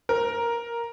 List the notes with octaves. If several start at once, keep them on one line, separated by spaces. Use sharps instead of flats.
A#4